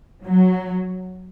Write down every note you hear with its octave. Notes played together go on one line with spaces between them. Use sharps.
F#3